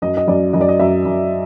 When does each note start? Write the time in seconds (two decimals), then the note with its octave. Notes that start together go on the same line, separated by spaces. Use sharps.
0.02 F#2 D#5
0.17 D#5
0.27 F#2 D5
0.53 F#2 D#5
0.61 D5
0.68 D#5
0.79 F#2 E5
1.05 F#2